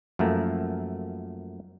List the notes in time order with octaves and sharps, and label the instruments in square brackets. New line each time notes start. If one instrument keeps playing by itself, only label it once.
[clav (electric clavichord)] F#2 F3 A3 A#3